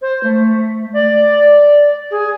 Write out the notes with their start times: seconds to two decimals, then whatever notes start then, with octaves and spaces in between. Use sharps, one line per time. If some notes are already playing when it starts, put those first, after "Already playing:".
0.02 C5
0.23 A3
0.93 D5
2.11 G#4